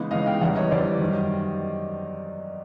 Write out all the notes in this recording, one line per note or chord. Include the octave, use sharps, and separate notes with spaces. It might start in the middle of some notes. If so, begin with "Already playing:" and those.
Already playing: C#3 E3 G#3 B3 D#4
C#3 E3 G#3 B3 D#4 D#5 F5
F5 G5
E2 C#3 E3 G3 E5 F#5
C#5 D#5
E2 C#3 E3 G3 C5 D5
F#2 D#3 G3